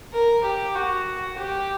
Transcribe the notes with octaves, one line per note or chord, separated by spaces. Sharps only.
A#4
G4
F#4
G4